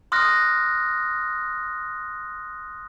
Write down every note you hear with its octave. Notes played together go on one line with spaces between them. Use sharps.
C6 D#6 F6 F#6 A#6